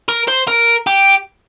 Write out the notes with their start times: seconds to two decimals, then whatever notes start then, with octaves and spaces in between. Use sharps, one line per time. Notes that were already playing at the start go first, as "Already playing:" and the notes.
0.09 A#4
0.28 C5
0.48 A#4
0.87 G4